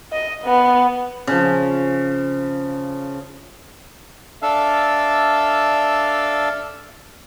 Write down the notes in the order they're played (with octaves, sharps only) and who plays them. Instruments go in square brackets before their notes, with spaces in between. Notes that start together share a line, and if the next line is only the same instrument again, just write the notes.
[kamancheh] D#5
B3
[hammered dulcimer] C#3 F3
[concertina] D4 A4 E5 F5